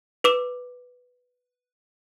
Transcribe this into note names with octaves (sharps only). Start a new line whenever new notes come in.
B4 D6 E7